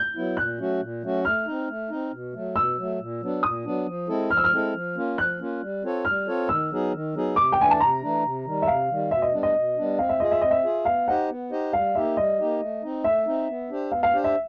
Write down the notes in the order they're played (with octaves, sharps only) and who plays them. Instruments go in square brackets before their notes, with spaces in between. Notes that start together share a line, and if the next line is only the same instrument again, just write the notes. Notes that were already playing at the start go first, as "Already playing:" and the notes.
Already playing: [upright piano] G6
[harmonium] F#3 B3 E4
[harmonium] A#2 [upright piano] F#6
[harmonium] F#3 A3 C#4 F#4
A#2
F#3 A3 C#4 F#4
[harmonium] A3 [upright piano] F6
[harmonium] C4 D#4
A3
C4 D#4
B2
F#3 A3
[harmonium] B2 [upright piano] E6
[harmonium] F#3 A3
A#2
F#3 B3 D4
[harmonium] A#2 [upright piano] D#6
[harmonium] F#3 B3 D4
F3
G#3 C4 E4 A4
[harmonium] F3 [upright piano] F6
[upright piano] E6
F6
[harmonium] G#3 C4 E4 A4
F3
A#3 C#4 F4
[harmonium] F3 [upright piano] F#6
[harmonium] A#3 C#4 F4
G3
C4 F4 A4 C#5
[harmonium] G3 [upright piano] F6
[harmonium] C4 F4 A4 C#5
[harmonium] D#3 [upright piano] E6
[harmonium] F#3 B3 D#4 G#4
D#3
F#3 B3 D#4 G#4
[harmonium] C3 [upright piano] D6
[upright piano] G5
[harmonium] E3 A3 D4 [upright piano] G#5
[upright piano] A5
[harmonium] C3 [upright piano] A#5
[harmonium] E3 A3 D4
C3
D#3 G3
[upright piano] E5
[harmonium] C3 [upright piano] F5
[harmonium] D#3 G3
[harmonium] B2 [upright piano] E5
[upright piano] D#5
[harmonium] G3 B3 D4
[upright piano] D#5
[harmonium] B2
G3 B3 D4
[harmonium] C4 [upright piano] F5
[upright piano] E5
[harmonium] F4 G#4 [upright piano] D#5
[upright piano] E5
[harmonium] C4 [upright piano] D#5
[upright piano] E5
[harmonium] F4 G#4
[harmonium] B3 [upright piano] F5
[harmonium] D#4 G4 C5 D#5 [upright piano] F#5
[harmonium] B3
D#4 G4 C5 D#5
[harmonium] G3 [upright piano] F5
[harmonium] A#3 D#4 G4 [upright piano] E5
[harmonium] G3 [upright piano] D#5
[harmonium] A#3 D#4 G4
A3
C4 D#4
[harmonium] A3 [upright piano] E5
[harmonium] C4 D#4
B3
D4 G4 C5
[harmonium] B3 [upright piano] F5
[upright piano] F5
[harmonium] D4 G4 C5
[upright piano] E5